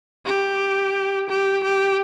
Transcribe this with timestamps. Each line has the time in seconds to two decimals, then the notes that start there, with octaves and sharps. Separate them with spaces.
0.26 G4
1.29 G4
1.63 G4